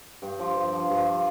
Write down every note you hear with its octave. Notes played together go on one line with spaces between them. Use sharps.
G2 G5
F3
G2
F3
G2
F3